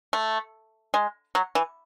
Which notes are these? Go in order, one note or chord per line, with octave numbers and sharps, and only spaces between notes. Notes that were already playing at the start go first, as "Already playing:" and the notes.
A3
G#3
F#3
E3